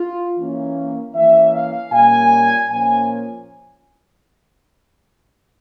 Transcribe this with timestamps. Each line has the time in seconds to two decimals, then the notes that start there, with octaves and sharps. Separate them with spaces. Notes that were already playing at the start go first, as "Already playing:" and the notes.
Already playing: F4
0.38 E3 A#3 C#4
1.15 E3 A#3 C#4 E5
1.54 F5
1.92 A#2 G3 A#3 C#4 G#5
2.70 A#2 F3 A#3 C#4 G#5